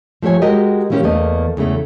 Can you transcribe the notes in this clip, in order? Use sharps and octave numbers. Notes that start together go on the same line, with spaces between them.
F3 A3 G4 C#5 G#5
G#3 F#4 G4 A#4 D#5
E3 A3 A#3 C#4 G4
E2 A3 A#3 D#5
E2 C#3 A3